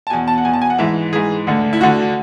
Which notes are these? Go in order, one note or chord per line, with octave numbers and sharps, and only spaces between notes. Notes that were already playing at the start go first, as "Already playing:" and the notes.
A5
E2 B2 G#5
A5
F#5
E2 B2 G#5
A5
G#5
F#5
G#2 E3 E5
G#2 E3 G#4
D2 D3
E4
D2 D3 F#4